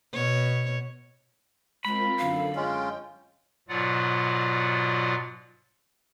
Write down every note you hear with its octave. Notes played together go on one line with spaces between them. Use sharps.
B2 C#5
G#3 C4 F4 A#4 B5
F#2 D3 A4 F5
G#3 C#4 F4 G5
G#2 B2 F#3 F4 D5 F#5